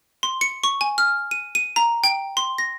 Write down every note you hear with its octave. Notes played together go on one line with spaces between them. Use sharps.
C6
C#7
C#6
G#5
F6
D#7
D#7
A#5
G5
C6
A#6